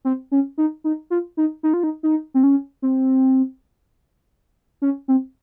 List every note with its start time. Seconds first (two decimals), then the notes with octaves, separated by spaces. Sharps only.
0.05 C4
0.32 C#4
0.58 D#4
0.84 D#4
1.10 F4
1.37 D#4
1.63 D#4
1.74 F4
1.84 D#4
2.03 D#4
2.34 C4
2.43 C#4
2.82 C4
4.82 C#4
5.08 C4